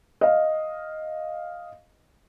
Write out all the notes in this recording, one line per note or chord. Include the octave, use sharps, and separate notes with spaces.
D#5 F5